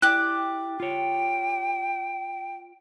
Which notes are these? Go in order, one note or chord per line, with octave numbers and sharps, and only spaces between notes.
E4 G4 D5 F#6
F4 C#5 G5